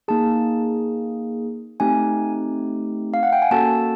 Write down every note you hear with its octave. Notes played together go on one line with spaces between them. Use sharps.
A#3 D#4 G#4 A5
A3 C4 D#4 G4 G#5
F5
F#5
G5
G#5
A#3 C#4 F#4 A4 A5